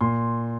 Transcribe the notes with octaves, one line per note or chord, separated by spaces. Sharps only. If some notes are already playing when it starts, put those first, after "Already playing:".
A#2 C6